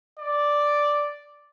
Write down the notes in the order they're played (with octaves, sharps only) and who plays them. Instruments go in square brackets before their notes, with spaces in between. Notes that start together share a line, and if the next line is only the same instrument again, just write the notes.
[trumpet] D5